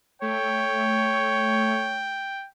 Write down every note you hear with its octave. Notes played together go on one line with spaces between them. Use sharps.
A3 C#5 G5